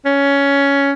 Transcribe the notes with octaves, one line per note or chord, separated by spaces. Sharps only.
C#4